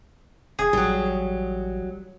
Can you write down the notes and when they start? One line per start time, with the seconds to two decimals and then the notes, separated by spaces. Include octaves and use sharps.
0.59 E1 G#4
0.73 A1 F#3 G3